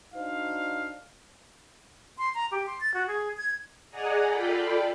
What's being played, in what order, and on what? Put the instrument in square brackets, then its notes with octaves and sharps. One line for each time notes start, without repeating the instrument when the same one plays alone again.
[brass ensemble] D4 D#4 F#4 C5 F5
[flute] C6
A#5
G4
C6
A6
F#4
G#4
G#6
[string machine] G#4 D5 D#5 F#5 G#5 A#5
F4 A4 D5 G5 B5